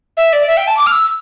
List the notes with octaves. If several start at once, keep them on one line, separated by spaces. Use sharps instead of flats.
E5
D5
E5
G5
A5
D6
F6
E6